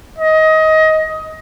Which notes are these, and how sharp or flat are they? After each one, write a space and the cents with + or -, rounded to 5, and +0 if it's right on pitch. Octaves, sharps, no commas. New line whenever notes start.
D#5 +20